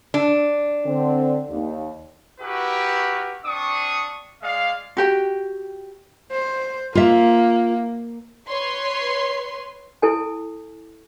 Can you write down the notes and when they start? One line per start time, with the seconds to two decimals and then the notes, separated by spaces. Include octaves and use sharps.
0.14 D4
0.85 D3 C4
1.49 D#2
2.41 E4 F#4 G4 A#4 B4
3.45 C4 D4 C#6 D#6
4.43 G#3 D5 F5
4.97 F#4 G4 G5
6.32 C5
6.95 A#3 F4 E5
8.48 B4 C#5 C6
10.02 E4 A4 G#5